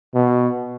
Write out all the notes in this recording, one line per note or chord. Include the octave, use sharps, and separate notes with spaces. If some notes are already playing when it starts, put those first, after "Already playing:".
B2